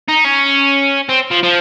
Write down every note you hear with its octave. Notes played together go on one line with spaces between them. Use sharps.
D#4
C#4
C4
F3
F3